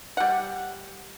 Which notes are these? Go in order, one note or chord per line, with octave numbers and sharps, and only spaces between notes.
G3 F#5